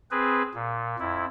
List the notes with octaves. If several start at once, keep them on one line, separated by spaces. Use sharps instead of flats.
C4 G#4 B4
A#2
F2 E4